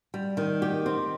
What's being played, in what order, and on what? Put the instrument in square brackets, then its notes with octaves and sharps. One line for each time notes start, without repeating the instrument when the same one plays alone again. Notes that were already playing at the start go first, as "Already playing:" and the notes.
[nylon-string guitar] G3
D#3
G4
C4